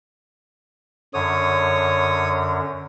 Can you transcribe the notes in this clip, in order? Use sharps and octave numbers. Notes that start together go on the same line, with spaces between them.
F#2 D3 C#5 D#6